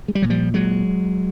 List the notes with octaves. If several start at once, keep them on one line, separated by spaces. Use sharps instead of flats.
G#3
G3
A#2 F#3
F3 G3
A#2 F#3 G#3